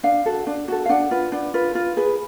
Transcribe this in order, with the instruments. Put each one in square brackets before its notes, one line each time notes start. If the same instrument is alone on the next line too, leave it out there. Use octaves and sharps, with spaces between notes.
[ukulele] D4 F5
F#4 A4
D4
F#4 A4
F5
D4 F#5
F4 B4
D4
F4 B4
F4
G#4 B4